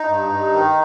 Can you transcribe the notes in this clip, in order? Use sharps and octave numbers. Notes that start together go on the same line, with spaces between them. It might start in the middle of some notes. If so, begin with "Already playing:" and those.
Already playing: D#4
G2
G2
D#3